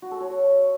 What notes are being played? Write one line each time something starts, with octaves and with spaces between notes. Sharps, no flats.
F#4
A4
C#5